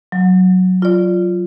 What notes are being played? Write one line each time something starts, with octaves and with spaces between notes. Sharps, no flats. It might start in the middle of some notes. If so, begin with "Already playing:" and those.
F#3
F4 D5